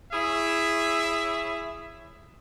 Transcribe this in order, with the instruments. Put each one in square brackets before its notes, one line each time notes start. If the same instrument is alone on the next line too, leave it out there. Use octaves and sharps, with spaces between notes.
[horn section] E4 G#4 C#5 E5